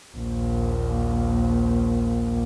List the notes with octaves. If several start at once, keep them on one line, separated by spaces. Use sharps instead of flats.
A#1 D#2